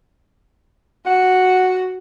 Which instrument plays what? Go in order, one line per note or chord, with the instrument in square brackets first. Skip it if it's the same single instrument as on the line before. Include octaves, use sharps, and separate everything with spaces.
[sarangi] F#4 [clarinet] F#5